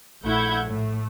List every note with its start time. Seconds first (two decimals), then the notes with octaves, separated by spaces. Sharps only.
0.23 A#1 A3 E4 F#5 G6 G#6
0.65 A2 A3